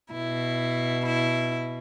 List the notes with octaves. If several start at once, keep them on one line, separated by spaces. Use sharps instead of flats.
B2 E4
E4